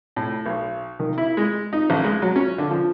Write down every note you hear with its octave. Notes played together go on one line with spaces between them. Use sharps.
A2
B1
D#3
E4
G#3
D#4
A1
G#3
F#3
C#4
D3
F3